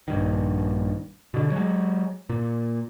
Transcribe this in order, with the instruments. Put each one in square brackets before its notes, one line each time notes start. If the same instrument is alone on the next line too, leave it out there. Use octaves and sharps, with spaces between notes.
[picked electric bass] A#1 G2 D#3
B2 D3
F#3 G#3
A#2